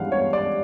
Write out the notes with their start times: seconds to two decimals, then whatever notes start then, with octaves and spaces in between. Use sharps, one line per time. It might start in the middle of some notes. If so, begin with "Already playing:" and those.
Already playing: G2 E3 G#3 F5 F#5
0.12 C#5
0.33 D5